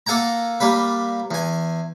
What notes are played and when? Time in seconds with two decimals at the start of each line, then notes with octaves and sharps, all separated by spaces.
0.06 A#3 A4 F#5 G#5 A#5
0.60 G3 A#3 B4
1.31 E2 G#5